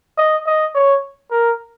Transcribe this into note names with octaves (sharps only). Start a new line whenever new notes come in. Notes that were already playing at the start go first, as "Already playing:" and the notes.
D#5
D#5
C#5
A#4